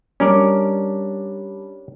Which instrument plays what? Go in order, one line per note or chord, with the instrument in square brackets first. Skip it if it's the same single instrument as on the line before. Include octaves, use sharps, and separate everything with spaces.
[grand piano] G3 D4 [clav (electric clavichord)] C#4 A#4 D5